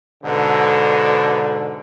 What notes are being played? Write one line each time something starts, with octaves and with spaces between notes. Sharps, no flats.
G#2 B2 D3